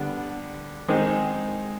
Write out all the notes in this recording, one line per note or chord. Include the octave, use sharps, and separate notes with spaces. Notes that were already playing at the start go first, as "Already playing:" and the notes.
Already playing: D3 G3 B3 D4
D#3 G#3 C4 D#4 G#4